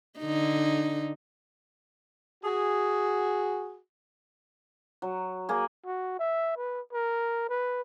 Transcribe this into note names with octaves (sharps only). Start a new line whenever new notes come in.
D3 D#4
F#4 G#4
F#3
A#3 G#4
F#4
E5
B4
A#4
B4